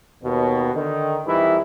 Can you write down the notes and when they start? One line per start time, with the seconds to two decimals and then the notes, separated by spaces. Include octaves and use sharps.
0.24 D#2 B2
0.74 D3 D#3
1.26 F2 D#3 E3 G3 D#4 E4